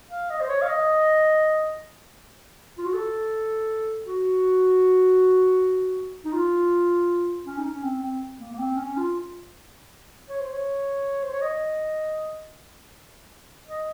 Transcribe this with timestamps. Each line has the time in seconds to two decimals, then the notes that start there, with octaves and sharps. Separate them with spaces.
0.11 F5
0.30 D#5
0.41 C5
0.49 C#5
0.62 F5
0.68 D#5
2.78 F4
2.86 F#4
2.94 A4
4.06 F#4
6.25 D#4
6.33 F4
7.46 C#4
7.58 D#4
7.65 C#4
7.83 C4
8.02 C4
8.40 A#3
8.53 A#3
8.59 C4
8.77 C#4
8.97 F4
10.29 C#5
10.41 C5
10.52 C#5
11.24 C5
11.33 C#5
11.42 D#5
13.67 D#5